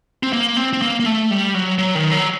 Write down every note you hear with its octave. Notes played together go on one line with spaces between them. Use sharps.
C4
A#3
C4
C4
A#3
A#3
A3
G3
F#3
F#3
D#3
F#3